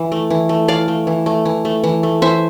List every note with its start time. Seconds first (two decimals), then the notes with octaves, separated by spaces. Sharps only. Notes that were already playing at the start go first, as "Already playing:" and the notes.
Already playing: E3
0.12 A3
0.30 E3
0.49 A3
0.68 E3 D5 F5
0.88 A3
1.07 E3
1.26 A3
1.45 E3
1.65 A3
1.84 E3
2.03 A3
2.22 E3 C5 E5